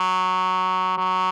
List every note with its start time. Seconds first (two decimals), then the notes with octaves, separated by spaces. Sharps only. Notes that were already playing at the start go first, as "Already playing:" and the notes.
Already playing: F#3
0.98 F#3